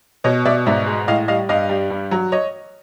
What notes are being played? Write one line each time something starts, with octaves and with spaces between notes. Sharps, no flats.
B2 C#5 D#5
B2 D5 E5
G#2 D5 E5
G#3
A2 D#5 F5
G3 D#5 F5
G2 D#5 F5
G3
G2
F#3
C#5 D#5